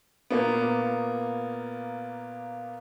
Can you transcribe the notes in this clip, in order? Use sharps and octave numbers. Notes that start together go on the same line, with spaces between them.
A#2 A#3 B3